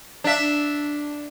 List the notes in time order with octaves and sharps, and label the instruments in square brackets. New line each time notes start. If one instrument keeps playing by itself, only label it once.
[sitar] D4 E5